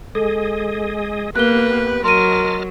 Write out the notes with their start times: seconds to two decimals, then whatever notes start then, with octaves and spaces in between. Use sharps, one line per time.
0.15 G#3 G#4 A4 D#5
1.36 A#3 B3 G4 B4 F#6 G7
2.04 F#3 A#4 D#5 A5 C6 F6 D#7